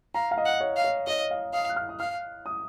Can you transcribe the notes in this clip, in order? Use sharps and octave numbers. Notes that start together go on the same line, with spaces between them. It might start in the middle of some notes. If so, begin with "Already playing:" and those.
F5 A#5
F5
D#5
F#5
C#5
F5
C#5
C#5 D#5
F5
F5 D#6
F#6
F6
D#6
F5 F6
D#6